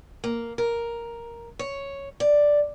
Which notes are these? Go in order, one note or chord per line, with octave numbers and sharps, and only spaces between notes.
A#3
A#4
C#5
D5